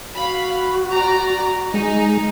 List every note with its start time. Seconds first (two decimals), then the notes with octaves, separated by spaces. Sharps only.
0.15 F#4 F5 B5
0.92 D5 A#5
1.74 G#3 D#4 G#5